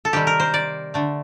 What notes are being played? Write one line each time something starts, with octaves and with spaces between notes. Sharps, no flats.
A4
C3 D#3 G3 G4
A#4
C5
D5
D3 A3